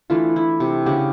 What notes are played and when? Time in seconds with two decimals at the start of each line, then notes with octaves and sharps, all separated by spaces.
0.10 E3 A3 D4 F4
0.36 E4
0.60 C3
0.86 C#3 D4 F#4 G4